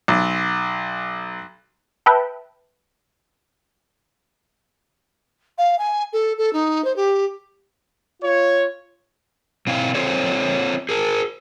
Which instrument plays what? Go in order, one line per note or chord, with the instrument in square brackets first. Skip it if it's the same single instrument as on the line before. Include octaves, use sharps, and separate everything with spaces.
[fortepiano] B1
[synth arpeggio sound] B4 E5 G5 A5
[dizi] F5
G#5
A4
A4
D#4
C5
G4
[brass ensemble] F4 C#5
[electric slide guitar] B2 C4 E4 F5
C4 F4 A4 C5 C#5
G#4 A#4